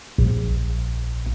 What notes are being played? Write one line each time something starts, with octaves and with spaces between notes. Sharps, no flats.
A#1